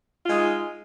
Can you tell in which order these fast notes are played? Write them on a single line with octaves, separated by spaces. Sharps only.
F4 G#3 D#4